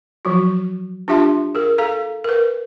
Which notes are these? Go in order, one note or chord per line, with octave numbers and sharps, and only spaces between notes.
F3 F#3 F#4
D4 F4 G4 E5 A5 C6
G#4 A#4
A4 F5 A#5
A#4 B4